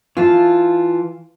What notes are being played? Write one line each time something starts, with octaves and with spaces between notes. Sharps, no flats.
E3 F4 F5 A5